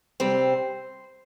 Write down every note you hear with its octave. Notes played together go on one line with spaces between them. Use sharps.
C3 G3 C4 C5